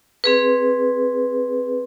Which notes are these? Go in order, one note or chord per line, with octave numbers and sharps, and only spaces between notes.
C4 G#4 B4